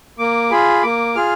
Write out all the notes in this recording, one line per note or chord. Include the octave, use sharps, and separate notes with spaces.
A#3 D6
F4 G#4 B5
A#3 D6
F4 G#4 F6